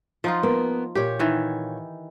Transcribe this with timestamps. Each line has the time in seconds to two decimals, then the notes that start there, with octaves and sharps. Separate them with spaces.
0.24 F3 D#4 F4 F#5
0.43 A#3 B3
0.95 A#2 G4 C#5
1.19 D#3 E3